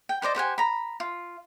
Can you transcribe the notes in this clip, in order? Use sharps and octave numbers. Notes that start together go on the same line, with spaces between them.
G5
B4 C5 D5 D#5
G4 C5 F#5 G#5
A#5 B5
F4